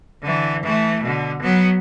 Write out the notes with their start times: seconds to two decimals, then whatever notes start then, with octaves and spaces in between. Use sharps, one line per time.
0.22 D3 E3
0.63 E3 A3
1.03 B2 D3
1.42 F#3 B3